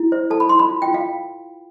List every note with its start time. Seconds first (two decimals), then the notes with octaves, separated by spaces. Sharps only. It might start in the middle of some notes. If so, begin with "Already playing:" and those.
Already playing: E4
0.12 C5
0.30 A4 A5
0.40 B5
0.49 E4 C6
0.59 B5
0.69 F4
0.82 G5
0.88 F4
0.94 F5